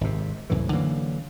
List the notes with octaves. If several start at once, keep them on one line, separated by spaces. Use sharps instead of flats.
G#1 C3
C2 F#2 A2 E3
D3 E3 F#3 A#3